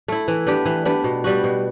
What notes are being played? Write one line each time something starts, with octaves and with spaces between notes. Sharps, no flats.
A3 E4
E3
B3 D4 G4
E3
B3 D4 G4
B2
G3 B3 F#4
B2